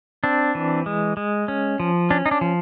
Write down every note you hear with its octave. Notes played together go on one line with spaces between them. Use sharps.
C4 D4
E3
G#3
G#3
C#4
F3
C#4 D4
D#4
D4
F3